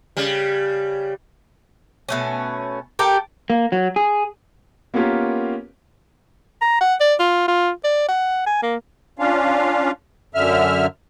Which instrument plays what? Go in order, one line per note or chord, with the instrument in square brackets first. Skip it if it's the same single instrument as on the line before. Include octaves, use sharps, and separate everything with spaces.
[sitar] C#3 G3
[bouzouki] B2 A3 C#4
G4 A4 A#4 G5
[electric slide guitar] A#3
F#3
G#4
[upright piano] A#3 B3 C#4 F4 G4 A#4
[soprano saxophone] A#5
F#5
D5
F4
F4
D5
F#5
G#5
A#3
[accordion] C#4 D4 F4 F5
F#2 D3 E5 F6